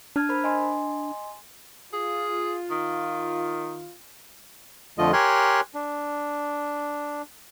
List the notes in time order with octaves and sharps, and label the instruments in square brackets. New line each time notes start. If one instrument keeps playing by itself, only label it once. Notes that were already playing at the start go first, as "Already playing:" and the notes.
[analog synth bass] D4 [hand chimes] A5 F6 G#6
[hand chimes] A#4 C5 B5
D#5 G#5 C6
[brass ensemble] F4 [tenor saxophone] G#4
[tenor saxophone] D#3
[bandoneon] F2 D3 F3 A3 F4 D#5
G4 A#4 C#5 G#5 C6 F#6
D4